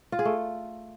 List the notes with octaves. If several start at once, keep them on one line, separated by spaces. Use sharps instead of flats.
F4
G#4
A3